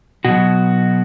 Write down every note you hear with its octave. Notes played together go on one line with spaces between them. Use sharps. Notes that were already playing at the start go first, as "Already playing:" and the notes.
B2 F#3 F#4